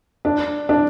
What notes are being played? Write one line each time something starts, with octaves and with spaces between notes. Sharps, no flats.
D4
D4